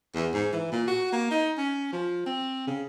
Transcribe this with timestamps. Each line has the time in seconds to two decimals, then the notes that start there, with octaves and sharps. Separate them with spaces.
0.15 E2
0.33 G#2
0.53 E3
0.72 A#2
0.88 F#4
1.12 A#3
1.31 D#4
1.57 C#4
1.93 F3
2.26 C4
2.67 C#3